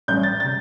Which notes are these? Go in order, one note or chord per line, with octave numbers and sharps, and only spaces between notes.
A1 G2 G3 G6
A6
C3 A6